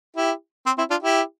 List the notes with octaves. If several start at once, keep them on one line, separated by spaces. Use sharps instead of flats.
E4 G4
C4
C4 E4
D4 F4
E4 G4